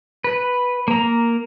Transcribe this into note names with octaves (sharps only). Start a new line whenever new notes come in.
B4
A#3 A#5